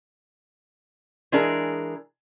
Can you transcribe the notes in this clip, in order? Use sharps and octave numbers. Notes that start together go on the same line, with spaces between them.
E3 G#3 D4 G#4 A#4